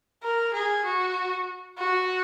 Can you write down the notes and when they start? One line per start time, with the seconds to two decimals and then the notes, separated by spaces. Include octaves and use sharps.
0.23 A#4
0.53 G#4
0.85 F#4
1.78 F#4